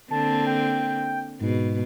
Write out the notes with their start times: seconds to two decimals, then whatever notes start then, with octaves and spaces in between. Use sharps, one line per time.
0.11 D3 A#3 C4 A5
0.47 G5
1.41 G#2 B2